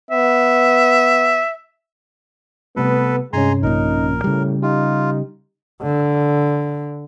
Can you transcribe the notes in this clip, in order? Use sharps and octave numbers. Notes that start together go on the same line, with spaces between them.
B3 E5
C3 G3 A3 B3 A4 B4
G2 C3 G#3 C#4 G#5 A#5 C6
A#1 A#2 D#4 A#4
A2 C#3 G3
D#4 F4 G4
D3